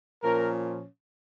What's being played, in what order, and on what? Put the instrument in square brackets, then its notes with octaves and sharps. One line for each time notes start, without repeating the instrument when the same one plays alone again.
[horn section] A#2 F3 C#4 A#4